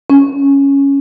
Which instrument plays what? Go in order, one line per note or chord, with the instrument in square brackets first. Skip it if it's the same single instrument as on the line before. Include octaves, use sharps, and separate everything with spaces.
[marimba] C#4